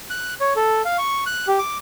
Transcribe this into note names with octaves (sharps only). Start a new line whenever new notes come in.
F#6
C#5
A4
F5
C#6
F#6
G4
D6